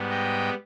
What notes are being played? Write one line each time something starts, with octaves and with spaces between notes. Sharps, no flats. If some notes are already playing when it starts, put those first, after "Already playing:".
Already playing: G#2 G3 B3
D#5 G5